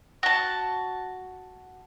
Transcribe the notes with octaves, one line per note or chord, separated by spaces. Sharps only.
F#4 A5